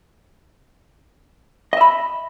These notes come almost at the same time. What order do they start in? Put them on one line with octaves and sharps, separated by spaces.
D#5 E5 B5